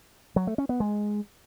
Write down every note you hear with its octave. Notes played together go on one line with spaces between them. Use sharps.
F#3
A3
C#4
B3
G#3